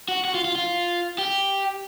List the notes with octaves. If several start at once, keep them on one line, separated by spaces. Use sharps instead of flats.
F#4
F#4
F4
F4
F4
G4